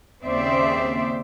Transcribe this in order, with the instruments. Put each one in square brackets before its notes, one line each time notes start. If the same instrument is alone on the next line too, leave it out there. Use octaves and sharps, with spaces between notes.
[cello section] D#2 C#3 C4 C5 D5 E5